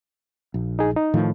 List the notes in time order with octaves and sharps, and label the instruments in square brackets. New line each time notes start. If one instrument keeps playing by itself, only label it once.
[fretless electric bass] A#1
[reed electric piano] D#4 G#4
D#4
[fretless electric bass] A2 D#3 F3